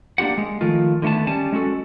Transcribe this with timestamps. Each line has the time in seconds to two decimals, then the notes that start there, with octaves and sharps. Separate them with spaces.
0.18 A#3 D4 F4 G4 F#5
0.38 G#3
0.61 D#3 F3 A3 F4
1.02 D3 D#3 A3 B3 A5
1.27 G3 C#4 G#5 A5
1.52 G#3 C#4 F#4 A4